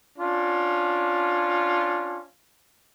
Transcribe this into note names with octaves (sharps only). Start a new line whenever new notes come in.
C#4 D4 F4